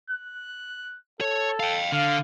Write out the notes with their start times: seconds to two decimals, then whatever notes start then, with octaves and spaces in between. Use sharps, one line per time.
0.10 F#6
1.21 A4 C#5
1.60 F5 G5
1.92 D3 F5